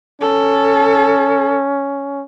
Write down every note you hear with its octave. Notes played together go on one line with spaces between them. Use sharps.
C#4 A4